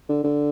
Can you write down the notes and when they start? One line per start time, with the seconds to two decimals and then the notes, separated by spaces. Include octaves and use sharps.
0.09 D3
0.24 D3